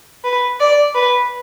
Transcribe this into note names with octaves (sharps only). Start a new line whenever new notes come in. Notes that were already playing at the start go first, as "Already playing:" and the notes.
B4
D5
B4